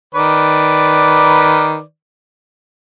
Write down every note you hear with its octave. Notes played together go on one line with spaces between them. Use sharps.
D#3 B4 D5